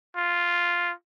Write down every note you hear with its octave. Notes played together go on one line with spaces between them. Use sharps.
F4